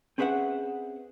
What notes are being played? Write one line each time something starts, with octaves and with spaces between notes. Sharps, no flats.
C4 C#4 G#4 B4 E5 F#5